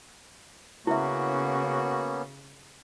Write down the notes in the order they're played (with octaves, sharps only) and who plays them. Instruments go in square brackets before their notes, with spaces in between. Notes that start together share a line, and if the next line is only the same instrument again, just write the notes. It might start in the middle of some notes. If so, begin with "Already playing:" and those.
[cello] C#3 [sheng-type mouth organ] A#3 B3 C#4 [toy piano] E4 E5 [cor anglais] F#4